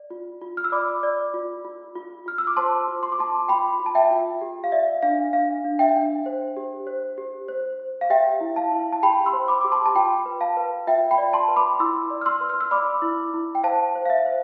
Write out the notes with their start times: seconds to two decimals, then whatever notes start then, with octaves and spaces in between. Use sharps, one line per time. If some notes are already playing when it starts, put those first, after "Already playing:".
Already playing: D5
0.10 F4
0.41 F4
0.57 F6
0.64 E6
0.72 D5 B5 D6
1.03 D5
1.34 F4
1.65 F4
1.95 F4
2.26 F4 F6
2.38 E6
2.47 D6
2.57 C5 A5 C6
2.88 F4
3.03 C6
3.12 D6
3.18 F4 A5 C6
3.48 F4 G5 B5
3.80 F4
3.86 A5
3.95 E5 G5
4.11 F4
4.41 G4
4.64 F5
4.72 D5 E5
5.03 D4 F5
5.33 D4 F5
5.64 D4
5.79 E5 G5
5.96 D4
6.26 C5
6.57 G4
6.87 C5
7.18 G4
7.48 C5
7.80 C5
8.01 F5
8.10 G4 E5 G5
8.41 E4
8.56 F5 A5
8.72 E4
8.93 A5
9.03 G4 G5 B5
9.26 C6 E6
9.33 C5
9.48 B5 D6
9.61 G4 D6
9.72 A5 C6
9.86 A5
9.95 F4 G5 B5
10.26 B4
10.41 F5 A5
10.57 B4
10.87 F4 E5 G5
11.11 G5 B5
11.18 D5
11.33 A5 C6
11.48 B4
11.56 B5 D6
11.80 E4 C6 E6
12.10 D5
12.21 F6
12.26 C6 E6
12.41 B4
12.49 F6
12.61 E6
12.71 D5 B5 D6
13.02 E4
13.34 E4
13.55 G5
13.63 C5 F5 A5
13.95 C5
14.05 F5
14.10 E5
14.26 C5